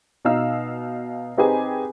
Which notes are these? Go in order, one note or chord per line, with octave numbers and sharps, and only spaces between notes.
B2 D#4 F5 E6
C4 D#4 G4 G#4 B4 G#5